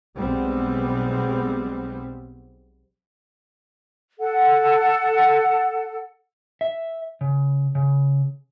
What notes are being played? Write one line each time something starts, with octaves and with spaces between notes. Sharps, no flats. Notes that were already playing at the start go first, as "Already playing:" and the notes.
B1 G3 G#3 B3 C4
A4 F#5
E5
C#3
C#3